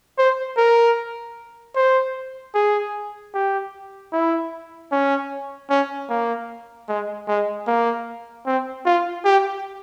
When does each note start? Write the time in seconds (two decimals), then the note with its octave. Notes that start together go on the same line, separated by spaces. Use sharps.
0.18 C5
0.57 A#4
1.76 C5
2.54 G#4
3.34 G4
4.13 E4
4.92 C#4
5.70 C#4
6.10 A#3
6.88 G#3
7.28 G#3
7.67 A#3
8.46 C4
8.86 F4
9.25 G4